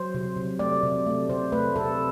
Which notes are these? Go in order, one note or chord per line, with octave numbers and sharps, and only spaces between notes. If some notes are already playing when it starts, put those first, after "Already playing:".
Already playing: F#3 C5
C3
C3
A3 D5
C3
A3
C3 C5
A3 B4
C3 A4